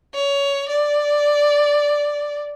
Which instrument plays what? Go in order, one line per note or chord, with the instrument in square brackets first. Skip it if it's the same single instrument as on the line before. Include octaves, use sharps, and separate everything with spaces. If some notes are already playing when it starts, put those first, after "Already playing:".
[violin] C#5
D5